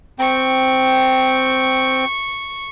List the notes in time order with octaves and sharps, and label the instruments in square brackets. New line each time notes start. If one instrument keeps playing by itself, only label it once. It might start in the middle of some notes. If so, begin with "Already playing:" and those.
[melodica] C4 G5 [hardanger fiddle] C#6